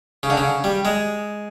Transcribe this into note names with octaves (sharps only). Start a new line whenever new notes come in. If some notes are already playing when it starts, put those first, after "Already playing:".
C#3
D3
C#3
G3
G#3